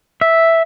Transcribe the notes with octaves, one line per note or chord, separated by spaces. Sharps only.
E5